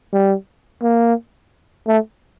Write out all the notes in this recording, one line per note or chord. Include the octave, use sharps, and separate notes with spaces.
G3
A#3
A3